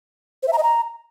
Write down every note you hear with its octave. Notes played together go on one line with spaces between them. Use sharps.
C5
E5
A#5
D#5
A#5